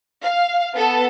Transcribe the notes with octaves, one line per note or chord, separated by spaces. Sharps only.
F5
B3 A4